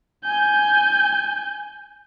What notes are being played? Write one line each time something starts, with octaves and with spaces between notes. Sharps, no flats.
G#5 G6